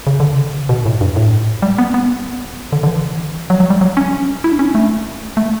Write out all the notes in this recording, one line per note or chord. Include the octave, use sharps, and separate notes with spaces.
C#3
D3
C#3
B2
A2
G2
A2
G3
B3
B3
D3
D3
E3
F#3
F#3
G3
F#3
C#4
E4
D4
C#4
A3
A3